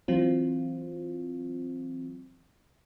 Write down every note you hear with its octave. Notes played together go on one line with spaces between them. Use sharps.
E3 F#3 C4 F4